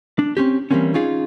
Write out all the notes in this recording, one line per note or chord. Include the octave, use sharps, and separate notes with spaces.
D4
C4 C#4 G4
E3 G3 G#3 A#3 C4 C#4
C#4 D#4 F4 G#4